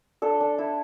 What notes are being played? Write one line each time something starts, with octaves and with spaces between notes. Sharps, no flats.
D4 A4
D4
E4